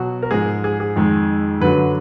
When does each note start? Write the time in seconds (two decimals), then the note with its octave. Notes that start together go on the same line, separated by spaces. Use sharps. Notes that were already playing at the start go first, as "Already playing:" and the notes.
Already playing: B2 F#3 F#4
0.22 A#4
0.31 G#2 F3 G#3 G#4
0.64 G#4
0.80 G#4
0.96 F2 D#3 G#3
1.60 F#2 D3 F#3 B4